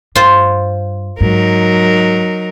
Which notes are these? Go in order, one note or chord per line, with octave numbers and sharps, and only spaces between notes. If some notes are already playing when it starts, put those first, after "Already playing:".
G2 F4 C5
G#2 F#3 D#4 A#4